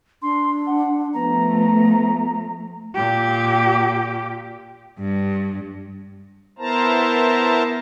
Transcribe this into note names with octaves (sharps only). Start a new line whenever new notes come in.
D4 C6
F#5
F3 A3 B3 A#5
A#2 G4
G2
B3 E4 A#4 C5 A5 A#5